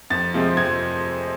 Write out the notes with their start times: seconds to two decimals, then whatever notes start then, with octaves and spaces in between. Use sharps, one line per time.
0.10 F2 A6
0.34 C3 F3 G#3 C4
0.57 F2 G#6